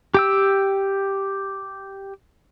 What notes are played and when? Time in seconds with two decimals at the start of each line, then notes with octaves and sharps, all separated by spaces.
0.14 G4 G5 E6